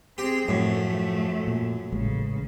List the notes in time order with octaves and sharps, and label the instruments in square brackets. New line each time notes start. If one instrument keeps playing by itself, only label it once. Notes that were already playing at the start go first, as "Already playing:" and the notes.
[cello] C4 G#4 [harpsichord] G4
[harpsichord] F#2 [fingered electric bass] A2 [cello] F3 A3
[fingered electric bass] A#2
[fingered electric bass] A1 G#3 [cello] C#3